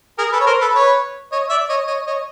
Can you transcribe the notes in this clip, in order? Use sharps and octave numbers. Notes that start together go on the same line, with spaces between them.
G#4 A#4
A4 B4
C#5
A#4 C5
A4 B4
B4 C#5
C#5 D#5
D5 E5
C#5 D#5
C#5 D#5
C#5 D#5